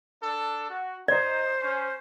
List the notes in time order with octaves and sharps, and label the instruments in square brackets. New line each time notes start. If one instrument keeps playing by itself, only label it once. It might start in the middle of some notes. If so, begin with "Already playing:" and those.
[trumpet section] D4 A4
F#4
[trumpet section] D#4 [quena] C5 [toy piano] D5
[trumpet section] C#4